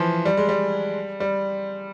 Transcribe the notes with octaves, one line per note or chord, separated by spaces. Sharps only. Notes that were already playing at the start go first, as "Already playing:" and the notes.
Already playing: E3 F3
G3
G#3
G3
G3